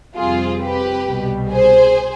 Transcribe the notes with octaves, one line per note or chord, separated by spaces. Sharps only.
F2 C3 G3 C4 F4 G#4
G4 B4
C2 B2 G3
G#4 C5